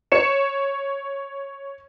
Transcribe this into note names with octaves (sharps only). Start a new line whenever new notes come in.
C#5 C#7 E7